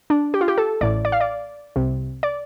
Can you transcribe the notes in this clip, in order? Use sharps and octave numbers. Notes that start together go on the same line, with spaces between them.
D4
G4
F4
G4
A4
A1 A2 D5
D5
F5
D5
C2 C3
D5